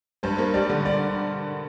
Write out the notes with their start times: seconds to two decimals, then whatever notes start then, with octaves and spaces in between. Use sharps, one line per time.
0.23 G2 C5
0.39 A#3
0.54 G3 D5
0.69 D3
0.85 D5